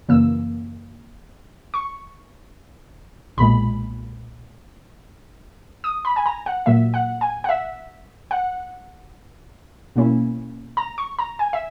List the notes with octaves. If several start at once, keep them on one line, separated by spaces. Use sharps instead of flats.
F#2 C#3 E3 A#3 E6
C#6
B1 A#2 G#3 B5
D#6
B5
G#5
A#5
F#5
A#2 F#3 A#3 E5
F#5
G#5
F#5
E5
F#5
B2 A#3 C#4 E4
A#5
C#6
A#5
G#5
E5